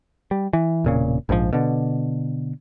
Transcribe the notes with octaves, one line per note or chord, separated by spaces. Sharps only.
G3
E3
E1 A#2 C#3
A#1 G#2 D3 F3
B2 D3